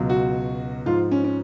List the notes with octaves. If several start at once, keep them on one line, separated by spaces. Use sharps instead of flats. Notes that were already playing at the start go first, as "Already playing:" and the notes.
Already playing: C#2 B2 F#3
F#4
G#2 F3 F4
C#4
C#4